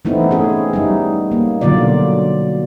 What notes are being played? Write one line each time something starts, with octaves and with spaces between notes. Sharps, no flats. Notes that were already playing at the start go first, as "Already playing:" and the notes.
E3 A3 B3 C4 D#4 E4
A3 C#4 G#4
G3 D#4
A#3
B2 D3 F#3 F4 D5